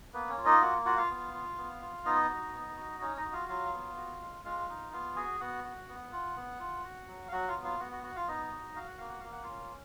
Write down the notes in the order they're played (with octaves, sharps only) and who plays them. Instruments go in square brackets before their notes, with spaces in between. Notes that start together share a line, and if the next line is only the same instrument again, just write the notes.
[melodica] A#3 B3 B4
C#4 C#5
F4
D#4 D#5
A#3 F#4 F#5
F4 F#4 F#5
F4 F5
B3
F4
B3
F4
B3 D#4 D#5
F#4
B3
F#4
C#4 D#4 C#5
D#4 D#5
F#4
F4 F5
F#3 F4 F5
B3
F#4
G#3
G#3 F4 F5
D#4
B3 F4 F5
F#4 G#4 G#5
B3 F#4 F#5
F#4
B3
F4
B3
F4
F#4
F#3
F5
F#3 F#4 F#5
F4 F5
B3
F4 F5
B3 F#4 F#5
F#4 F#5
F#4 F#5
F4 F5
B3 D#4 D#5
F#4
F#4 F5
F#5
A#3 F5
F#5
A#3 F5
F#5
C#4 F4 F5